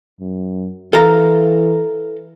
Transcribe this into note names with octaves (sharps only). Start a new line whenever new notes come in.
F#2
E3 A4 F5 A#5